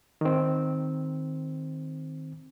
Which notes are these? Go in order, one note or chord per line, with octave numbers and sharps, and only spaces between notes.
D#3 C4